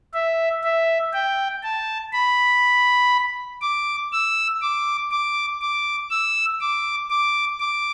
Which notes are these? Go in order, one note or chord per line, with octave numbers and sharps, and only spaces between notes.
E5
E5
G5
A5
B5
D6
E6
D6
D6
D6
E6
D6
D6
D6